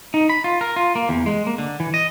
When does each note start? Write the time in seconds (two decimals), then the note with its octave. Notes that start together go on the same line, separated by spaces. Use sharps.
0.14 D#4
0.29 B5
0.44 F4
0.61 A#4
0.76 F4
0.96 A#3
1.09 E2
1.26 G#3
1.47 A#3
1.58 D3
1.80 E3
1.94 D#5